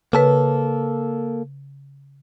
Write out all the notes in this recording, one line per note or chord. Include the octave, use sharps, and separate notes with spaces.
C#3 A#3 A4 B4